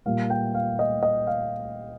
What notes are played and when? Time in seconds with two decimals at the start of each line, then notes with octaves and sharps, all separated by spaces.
0.06 A#2 G3 A#3 F5
0.30 G5
0.54 F5
0.79 D#5
1.03 D#5
1.27 F5